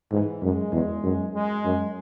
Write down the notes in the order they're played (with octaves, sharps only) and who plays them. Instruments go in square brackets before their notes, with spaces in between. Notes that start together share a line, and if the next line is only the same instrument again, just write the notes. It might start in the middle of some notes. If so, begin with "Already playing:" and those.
[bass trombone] G#2 [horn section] E3
[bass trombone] F#2 [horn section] G#3
[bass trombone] E2
F#2
[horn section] G#3
[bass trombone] F#2